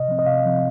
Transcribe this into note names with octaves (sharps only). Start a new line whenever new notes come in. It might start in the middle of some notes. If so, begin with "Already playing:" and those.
Already playing: C3 D#5
F3 C4
D#5
C3 F5
F3 C4